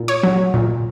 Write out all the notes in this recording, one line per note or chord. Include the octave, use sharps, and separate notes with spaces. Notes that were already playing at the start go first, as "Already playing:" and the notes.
Already playing: A#2
C#5
F#3
A#2